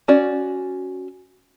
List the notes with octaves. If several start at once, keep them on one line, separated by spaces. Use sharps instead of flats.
C#4 F#4 D5